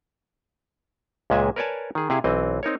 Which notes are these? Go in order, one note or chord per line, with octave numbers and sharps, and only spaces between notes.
C#2 A#2 G#3 E5 G#5
A#4 B4 C#5 D5 G#5 A5
D#3 G#4
C3 E4 G#4 F5
B1 E3 C4 D#5
C4 D#4 A#4 C#5